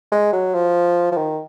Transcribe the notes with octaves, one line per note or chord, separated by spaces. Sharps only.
G#3
F#3
F3
F3
D#3